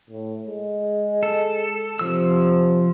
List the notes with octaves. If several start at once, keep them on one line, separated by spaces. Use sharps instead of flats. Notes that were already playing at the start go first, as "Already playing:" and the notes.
A2
G#3
A4
C3 F3 E6